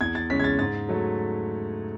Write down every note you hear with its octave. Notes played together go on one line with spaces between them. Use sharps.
E2 G#6
A6
C#3 G#3 C#4 B6
G#6
A6
G#2 A6
F#3 A3